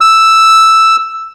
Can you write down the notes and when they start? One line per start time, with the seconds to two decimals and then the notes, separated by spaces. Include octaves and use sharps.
0.01 E6